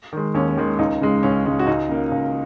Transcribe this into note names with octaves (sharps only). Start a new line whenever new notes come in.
D#3 G#3
D#2 C#4
D#3 G#3
C#2 D#4
C#3 G#3
C#2 C#4
C#3 G#3
F#4
C#2 D#4
C#3 A#3
C#2